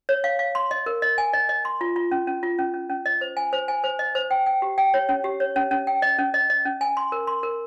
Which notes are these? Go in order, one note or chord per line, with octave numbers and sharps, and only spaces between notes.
C#5
F5
F5
C6
D#5
A#4
D#5
G#5
D#5
D#5
C6
F4
F4
C#4
C#4
F4
C#4
C#4
C#4
D#5
C5
G#5
C5
G#5
C5
D#5
C5
G5
G5
G4
G5
C#5
C#4
G4
C#5
C#4
C#4
G5
D#5
C#4
D#5
D#5
C#4
G#5
C6
A#4
C6
A#4